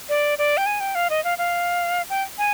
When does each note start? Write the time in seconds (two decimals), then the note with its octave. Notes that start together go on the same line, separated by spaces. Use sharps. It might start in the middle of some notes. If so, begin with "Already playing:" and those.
0.09 D5
0.38 D5
0.57 G5
0.66 G#5
0.80 G5
0.95 F5
1.10 D#5
1.24 F5
1.38 F5
2.10 G5
2.38 G#5